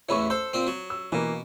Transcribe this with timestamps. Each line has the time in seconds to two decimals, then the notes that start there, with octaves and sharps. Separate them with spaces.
0.09 A1 E2 E3 C#5 B5 C#6
0.30 A4 C5
0.53 A#2 C4
0.67 F#3
0.90 E6
1.12 B2 E3 A#3